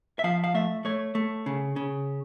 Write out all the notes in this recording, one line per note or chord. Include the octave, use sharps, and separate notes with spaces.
E5
F3 F5
F5
A3 E5
A3 C#5
A3
C#3
C#3